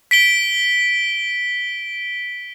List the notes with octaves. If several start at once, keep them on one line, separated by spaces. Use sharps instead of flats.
B6 D7 G7